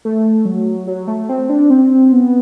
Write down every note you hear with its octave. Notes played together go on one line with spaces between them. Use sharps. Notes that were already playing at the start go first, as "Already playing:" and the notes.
A3
F#3
F#3
A3
C4
D4
C4
B3